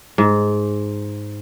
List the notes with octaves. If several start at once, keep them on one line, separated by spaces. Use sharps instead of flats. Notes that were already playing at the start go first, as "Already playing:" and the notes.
G#2